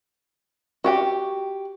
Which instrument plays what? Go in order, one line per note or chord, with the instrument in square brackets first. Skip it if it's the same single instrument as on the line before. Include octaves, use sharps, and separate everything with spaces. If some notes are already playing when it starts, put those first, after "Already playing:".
[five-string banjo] F#4 G4 G5